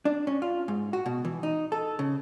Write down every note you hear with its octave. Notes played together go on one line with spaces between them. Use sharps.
D4
C#4
F4
G#2
F#4
B2
E3
D#4
A4
C#3